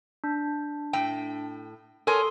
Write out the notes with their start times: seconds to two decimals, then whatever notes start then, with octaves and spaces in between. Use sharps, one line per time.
0.24 D4
0.93 A2 G5
2.07 A4 A#4 C#5 G#5 C6 D#6